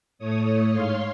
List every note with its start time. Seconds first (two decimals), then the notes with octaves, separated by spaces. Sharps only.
0.19 A2 A3 C#5 D#6
0.71 G#2 C#5 F5 C6